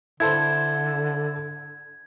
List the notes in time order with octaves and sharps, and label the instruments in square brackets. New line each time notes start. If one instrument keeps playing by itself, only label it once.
[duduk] D3 [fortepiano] E4 A4 C5 [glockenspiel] G#6